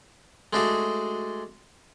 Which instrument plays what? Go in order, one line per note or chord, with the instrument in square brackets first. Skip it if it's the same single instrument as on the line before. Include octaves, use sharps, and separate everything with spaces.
[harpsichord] G#3 A3 D4 D#4 F#4 G#4